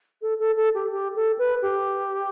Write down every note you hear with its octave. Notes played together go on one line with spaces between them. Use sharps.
A4
A4
A4
G4
G4
A4
B4
G4